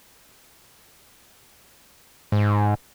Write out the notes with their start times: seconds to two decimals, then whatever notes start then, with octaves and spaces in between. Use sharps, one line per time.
2.32 G#2